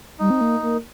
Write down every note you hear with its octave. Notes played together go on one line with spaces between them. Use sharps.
G3 D#4
C4
A#3
A#3